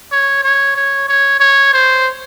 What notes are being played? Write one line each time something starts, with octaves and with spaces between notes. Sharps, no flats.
C#5
C#5
C#5
C#5
C#5
C5